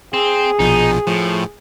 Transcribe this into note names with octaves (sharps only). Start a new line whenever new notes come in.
C4 G#4
A#1 B2 F3 D#4
A2 F3